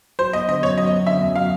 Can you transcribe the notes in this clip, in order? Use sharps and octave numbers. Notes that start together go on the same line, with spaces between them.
F#3 C5
B3 D#5
D3 D#5
F#2 C#5
F#3 D#5
B3
D3 E5
F#2
F#3 F5